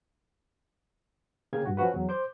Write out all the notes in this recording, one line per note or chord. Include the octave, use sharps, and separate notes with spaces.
C#3 A#3 G#4 F5 G5 G#6
G2 F#4
F3 C#4 F#4 B4
E2 F#3
C5 D6 G6